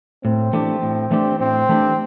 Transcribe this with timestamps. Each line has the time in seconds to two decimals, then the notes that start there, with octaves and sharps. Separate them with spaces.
0.24 A2 C4
0.53 E3 A3 D4 G4
0.82 A2
1.11 E3 A3 D4 G4
1.40 A2 C4
1.69 E3 A3 D4 G4